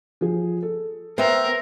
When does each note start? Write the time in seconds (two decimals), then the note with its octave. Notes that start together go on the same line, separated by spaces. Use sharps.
0.21 F3 G#4
0.62 A4
1.18 B3 A#4 C5 E5 G5